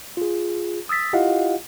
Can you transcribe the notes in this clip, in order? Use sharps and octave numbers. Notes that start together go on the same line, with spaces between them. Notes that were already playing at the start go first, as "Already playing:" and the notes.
F4 G#4
D#6 E6 A6 B6
E4 F4 G4 D#5 F5 F#5